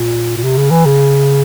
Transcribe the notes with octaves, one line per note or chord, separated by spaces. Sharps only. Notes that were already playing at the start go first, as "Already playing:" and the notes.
Already playing: A#2
A#2
C3
C#3
E3
C#3